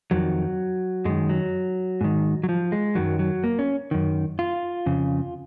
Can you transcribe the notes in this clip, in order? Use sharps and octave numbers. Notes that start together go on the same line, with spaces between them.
F2 D#3 F#3
F#2 D#3 G#3
F#3
G#2 D#3
F#3
F3
G#3
F#2 D#3 F#3
F#3
A#3
C#4
F#2 D#3
F4
F2 C#3